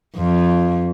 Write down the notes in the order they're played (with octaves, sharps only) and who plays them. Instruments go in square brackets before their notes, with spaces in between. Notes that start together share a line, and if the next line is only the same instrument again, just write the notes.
[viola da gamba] F2